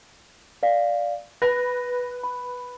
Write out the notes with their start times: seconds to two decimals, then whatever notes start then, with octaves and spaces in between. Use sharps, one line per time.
0.63 D5 F5
1.42 B4 A#6
2.24 B5